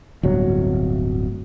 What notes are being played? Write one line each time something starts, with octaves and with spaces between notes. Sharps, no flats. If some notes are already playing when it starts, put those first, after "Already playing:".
D1 G1 F#3